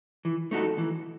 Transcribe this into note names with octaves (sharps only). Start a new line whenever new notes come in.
E3
A3 D#4 F#4 A4
E3